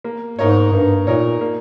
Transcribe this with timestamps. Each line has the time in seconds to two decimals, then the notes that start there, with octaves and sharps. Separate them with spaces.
0.04 A#3
0.39 G#2 D#4 A#4 C#5
0.73 G2 A#3
1.07 A#2 D#4 A#4 C#5
1.41 A#3